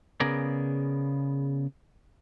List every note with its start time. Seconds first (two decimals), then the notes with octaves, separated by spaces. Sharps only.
0.20 C#3 B3 G#4 A#4 D5